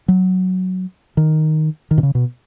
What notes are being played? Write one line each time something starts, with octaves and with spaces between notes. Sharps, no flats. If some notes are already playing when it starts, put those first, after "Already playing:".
F#3
D#3
D#3
B2
C#3
B2